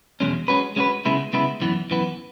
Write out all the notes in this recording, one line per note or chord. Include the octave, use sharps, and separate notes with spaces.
E2 B2 G#3 C#4
G#3 C#4 F#4 B4
G#3 C#4 F#4 B4
C#3 G#3 B3 E4
C#3 G#3 B3 E4
F#2 E3 B3
F#2 E3 B3